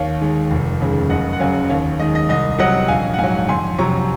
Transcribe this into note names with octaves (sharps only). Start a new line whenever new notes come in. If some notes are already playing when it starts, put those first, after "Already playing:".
Already playing: D#2 C#5 F5
D#3 G#3
F1
D#2 C#3 G#3
F#1 D#5 F#5
F#5
F#2 C#3 F#3 F5 G#5
D#2 C#5 F5
D#3 G#3 D#5
D#5
C2 D#5
C3 F#3 D#5 F#5
A#1 F5 G#5
F#5
G#2 F#3 F5 G#5
F2 G#5 C6
C3 F#3 A#5 C#6